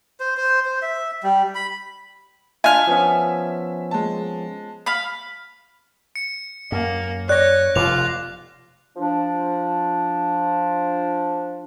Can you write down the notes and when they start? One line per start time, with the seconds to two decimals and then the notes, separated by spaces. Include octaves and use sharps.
0.20 C5
0.37 C5
0.65 C5
0.82 E5
1.23 G3
1.55 B5
2.64 D4 F4 E5 G#5 F6
2.87 F3 B3 C#4
3.91 G#3 A5
4.86 F5 B5
6.16 C#7
6.72 F#2 A#3
7.29 C#5 D5 F#6 A#6
7.76 F1 B2 F4 D6 F7
8.97 F3 D4